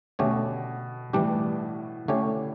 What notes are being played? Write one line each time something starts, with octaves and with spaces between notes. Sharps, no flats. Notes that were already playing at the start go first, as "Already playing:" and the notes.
B2 D3 A3 C#4 G4 C#5
A2 E3 G3 D4 G4
D3 A3 C#4 G4 C#5